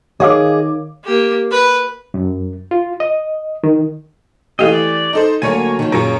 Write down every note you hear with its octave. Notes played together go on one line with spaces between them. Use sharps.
D#3 G#4 C#5 D#5 F5 D6
A#3 G4
B4
F#2
F4
D#5
D#3
E3 A3 G4 D#5 F5
D5
D#4 A4 C5
D2 F#3 A#3 C#5 G#5 D#7
D#3 F3
F#2 A#2 F4 G#4 A#4 C#5